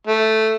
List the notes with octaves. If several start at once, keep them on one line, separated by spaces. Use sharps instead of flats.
A3